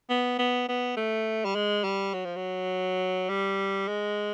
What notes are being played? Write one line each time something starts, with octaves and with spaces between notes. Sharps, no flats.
B3
B3
B3
A3
G3
G#3
G3
F#3
F3
F#3
G3
G#3